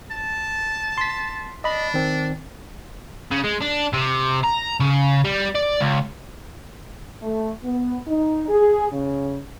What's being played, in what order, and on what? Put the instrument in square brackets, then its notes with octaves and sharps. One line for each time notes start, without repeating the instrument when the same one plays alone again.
[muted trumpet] A5
[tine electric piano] C6 B6
[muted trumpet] D4 [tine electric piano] D#5 B5
[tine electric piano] D#3 C4
[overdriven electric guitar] C#3
G#3
D4
C3
A#5
C#3
G3
D5
C#2
[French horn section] A3
B3
D#4
G#4
C#3